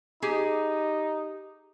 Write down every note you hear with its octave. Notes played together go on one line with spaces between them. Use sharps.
D#4 G4 G#4